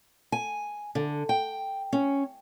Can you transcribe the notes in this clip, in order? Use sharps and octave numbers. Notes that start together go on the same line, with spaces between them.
G#5
D3
G5
C#4